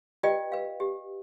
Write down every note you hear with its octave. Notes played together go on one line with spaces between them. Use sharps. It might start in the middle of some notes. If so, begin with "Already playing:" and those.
F4 G4 B4 D5 D#5 G5
B4 F5
G4